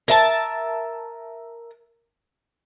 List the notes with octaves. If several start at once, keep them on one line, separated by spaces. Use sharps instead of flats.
A#4 E5 A5